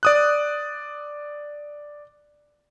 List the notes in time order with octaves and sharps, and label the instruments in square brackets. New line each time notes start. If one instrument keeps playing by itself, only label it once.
[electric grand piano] D5 D#6 F#6